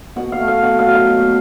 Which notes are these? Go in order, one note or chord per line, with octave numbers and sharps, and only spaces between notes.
B2 F#5
F5
A3
F5
B2 F#5
F5
F#3
F5
B2